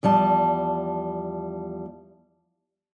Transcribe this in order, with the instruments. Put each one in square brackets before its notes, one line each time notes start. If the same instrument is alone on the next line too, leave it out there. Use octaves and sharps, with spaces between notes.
[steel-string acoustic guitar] E2 F3 G3 A5